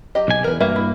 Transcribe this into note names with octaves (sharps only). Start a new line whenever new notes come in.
F#3 G4 D#5
B1 G#5
E2 A#4 B4
G2 A#3 F#4 B4 E5
E4